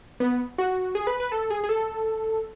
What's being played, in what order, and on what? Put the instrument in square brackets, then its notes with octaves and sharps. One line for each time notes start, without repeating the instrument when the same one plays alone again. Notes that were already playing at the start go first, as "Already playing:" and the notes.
[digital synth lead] B3
F#4
G#4
B4
B4
A4
G#4
G#4
A4